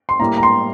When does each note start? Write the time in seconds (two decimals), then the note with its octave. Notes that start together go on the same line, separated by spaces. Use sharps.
0.09 C6
0.20 A2 G3 A#3 A#5
0.38 A#5
0.43 C6